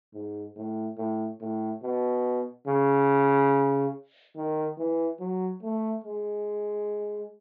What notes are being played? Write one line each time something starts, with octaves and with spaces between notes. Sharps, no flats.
G#2
A2
A2
A2
B2
C#3
D#3
E3
F#3
A3
G#3